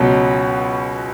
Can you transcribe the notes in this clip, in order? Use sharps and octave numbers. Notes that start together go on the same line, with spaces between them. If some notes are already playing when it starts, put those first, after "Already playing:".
Already playing: C#2 B2 F#3 C#4